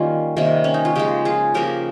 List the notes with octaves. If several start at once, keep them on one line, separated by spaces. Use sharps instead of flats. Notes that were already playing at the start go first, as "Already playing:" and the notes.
Already playing: D#3 G3 A#3 C#4 F4
C3 D#3 G3 A#3
C#4
D#4
F4
C#3 F3 G#3 D#4 G4
F4 G#4
C#3 F3 A#3 G4 A#4